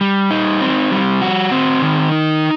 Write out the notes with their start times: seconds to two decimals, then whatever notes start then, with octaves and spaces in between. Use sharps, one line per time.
0.01 G3
0.31 D#4
0.61 C4
0.91 G3
1.21 F#4
1.52 C4
1.82 D#3
2.12 D#4